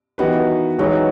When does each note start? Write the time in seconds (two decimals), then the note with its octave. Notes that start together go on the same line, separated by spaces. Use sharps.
0.18 D#3 E3 B3 F#4 B4
0.78 E3 F#3 G#3 D#4 F#4 B4